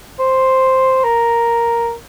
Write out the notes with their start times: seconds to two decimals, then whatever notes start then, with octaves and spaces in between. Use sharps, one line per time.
0.19 C5
1.04 A#4